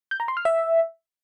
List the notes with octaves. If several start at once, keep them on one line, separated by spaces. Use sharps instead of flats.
G6
A#5
C6
F6
E5